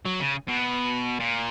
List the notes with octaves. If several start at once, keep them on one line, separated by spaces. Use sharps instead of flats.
F#3
C#3
B2
A#2